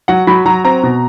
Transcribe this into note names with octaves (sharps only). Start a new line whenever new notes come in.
F#3 F#5
F#3 B5
F#3 A#5
C4 A#5
B2